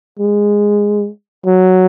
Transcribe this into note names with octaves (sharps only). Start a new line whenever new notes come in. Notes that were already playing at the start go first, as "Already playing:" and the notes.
G#3
F#3